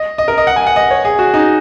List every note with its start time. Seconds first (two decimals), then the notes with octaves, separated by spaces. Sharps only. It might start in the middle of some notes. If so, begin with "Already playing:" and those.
Already playing: D#5
0.18 D#5
0.28 A#4
0.38 D#5
0.47 F#5
0.56 G#5
0.67 F#5
0.76 D#5
0.90 C#5
1.05 G#4
1.19 F#4
1.34 D#4